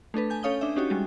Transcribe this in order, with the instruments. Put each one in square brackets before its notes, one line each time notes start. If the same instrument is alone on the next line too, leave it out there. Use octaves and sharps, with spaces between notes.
[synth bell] A3 D4 A4 B4
G#5 G6
C#4 A4 C#5 F5 D#6 G7
D4 E5
C#4 D#4 F#4 G4 C#5
G3 G#3 F#4